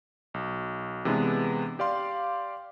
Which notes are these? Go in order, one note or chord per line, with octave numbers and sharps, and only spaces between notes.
B1
C3 E3 G#3 B3 D4
G4 D5 F5 C6